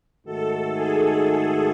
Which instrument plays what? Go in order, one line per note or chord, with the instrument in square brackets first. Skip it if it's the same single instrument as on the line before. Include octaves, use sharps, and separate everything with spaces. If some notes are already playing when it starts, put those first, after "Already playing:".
[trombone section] G#2 D#3 A3 D#4 F#4 [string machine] A4
[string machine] G#4
G#4